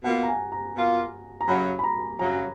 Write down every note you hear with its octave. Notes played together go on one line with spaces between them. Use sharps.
B2 A#3 F4 F#5
A#5
G#5
A#5
B2 A#3 F4
A#5
F#2 C#3 F#3 B5
B5
A#5
F#2 C#3 F#3 A#5